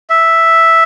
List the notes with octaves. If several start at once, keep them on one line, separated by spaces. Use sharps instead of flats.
E5